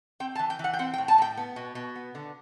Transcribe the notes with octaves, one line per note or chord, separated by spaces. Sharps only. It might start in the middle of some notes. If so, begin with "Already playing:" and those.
C4 G5
A5
E3
G5
E3
F#5
G5
C4 F#5
G5
A2
A5
A2 G5
B3
B2
B2
B3
D3